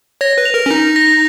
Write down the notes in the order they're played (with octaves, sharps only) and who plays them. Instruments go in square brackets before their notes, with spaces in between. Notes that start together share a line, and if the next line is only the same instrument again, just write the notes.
[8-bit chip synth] C#5 [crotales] A#6
[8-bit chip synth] B4
[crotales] F7
[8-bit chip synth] A#4
C#4
[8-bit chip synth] D#4 [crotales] A#6
[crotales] A#6